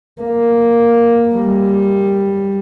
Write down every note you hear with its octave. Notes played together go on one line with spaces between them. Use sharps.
A#3
G3